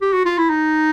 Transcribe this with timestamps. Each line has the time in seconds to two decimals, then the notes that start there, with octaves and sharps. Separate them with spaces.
0.02 G4
0.13 F#4
0.25 F4
0.38 E4
0.50 D#4